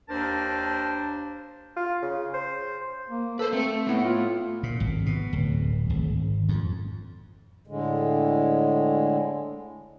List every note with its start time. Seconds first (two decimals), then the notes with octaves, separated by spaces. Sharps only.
0.08 D#2 D4 A#4 C5 A5
1.76 F4
2.02 C#3
2.34 C5
3.10 A#3
3.39 A4 B4 C5
3.53 A3 C4 A4
3.87 A3 B3 E4
4.05 F4
4.63 A#2
4.80 G#1
5.06 B2
5.33 D1
5.90 G#1
6.49 F2
7.67 A2 D3 G#3